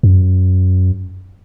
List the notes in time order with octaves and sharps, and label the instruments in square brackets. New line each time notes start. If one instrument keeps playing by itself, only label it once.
[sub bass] F#2